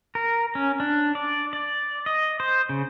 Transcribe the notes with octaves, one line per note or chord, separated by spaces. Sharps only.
A#4
C#4
D4
D5
D5
D#5
C5
C#3